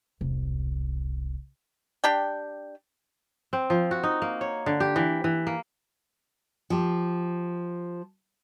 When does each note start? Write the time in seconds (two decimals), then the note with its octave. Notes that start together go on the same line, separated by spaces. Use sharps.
0.21 E1 C2
2.04 D4 G4 G5
3.53 C4
3.70 F3
3.91 F#4
4.03 D#4
4.22 A#3
4.41 C#5
4.66 D3
4.80 G4
4.96 E3
5.24 E3
5.47 A#3
6.70 F3 G4